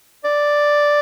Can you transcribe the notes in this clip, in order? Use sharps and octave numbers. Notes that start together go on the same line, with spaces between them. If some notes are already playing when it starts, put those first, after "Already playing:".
D5